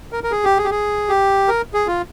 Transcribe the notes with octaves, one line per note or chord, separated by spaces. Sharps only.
A#4
A#4
G#4
G4
G#4
G4
G#4
G4
A#4
G#4
F4